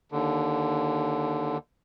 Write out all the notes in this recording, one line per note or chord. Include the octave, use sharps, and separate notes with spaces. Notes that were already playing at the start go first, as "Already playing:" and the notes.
D#2 D3